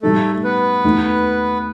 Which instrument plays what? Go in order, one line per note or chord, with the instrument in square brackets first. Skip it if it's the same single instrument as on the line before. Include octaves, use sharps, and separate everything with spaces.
[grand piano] A2 G3 D#4 [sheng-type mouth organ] A3 A4
[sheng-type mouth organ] B3 B4
[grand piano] D#2 D#3 A3 D#4